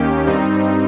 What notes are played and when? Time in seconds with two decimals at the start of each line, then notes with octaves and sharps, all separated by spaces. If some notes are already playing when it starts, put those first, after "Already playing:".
Already playing: D#2 D#3 A#3 C#4 G4
0.26 G2 G3 C4 D#4